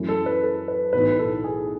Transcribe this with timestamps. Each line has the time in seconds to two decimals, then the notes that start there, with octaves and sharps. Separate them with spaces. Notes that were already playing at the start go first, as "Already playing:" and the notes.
Already playing: F#2 E3 A3 C#4 E4
0.09 A4
0.26 B4
0.43 A4
0.68 B4
0.93 B1 A2 E3 B3 D#4 B4
1.19 A4
1.44 G#4